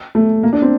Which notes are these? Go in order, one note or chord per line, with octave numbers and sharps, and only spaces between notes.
A3
A#3
D4
C4